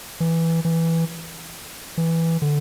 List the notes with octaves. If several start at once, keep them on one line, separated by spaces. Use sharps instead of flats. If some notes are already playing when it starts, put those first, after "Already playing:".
E3
E3
E3
D3